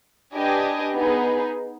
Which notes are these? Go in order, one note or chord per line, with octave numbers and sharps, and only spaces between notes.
D4 G4 B4 D#5 G#5
B3 D#4 G#4